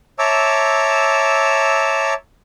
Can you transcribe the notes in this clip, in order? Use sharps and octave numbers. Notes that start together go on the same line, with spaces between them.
C#5 E5 A5 A#5 D6 E6